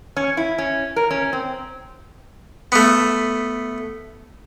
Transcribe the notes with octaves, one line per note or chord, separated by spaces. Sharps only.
C#4
E4
C#4
A#4
C#4
C4
A3 B3